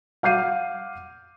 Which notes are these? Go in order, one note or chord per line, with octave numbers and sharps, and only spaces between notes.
F5 F#5 D6 G6 C7 D#7